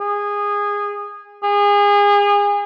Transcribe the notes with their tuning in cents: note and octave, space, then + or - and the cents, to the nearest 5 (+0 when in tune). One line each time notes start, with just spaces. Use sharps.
G#4 -20
G#4 -30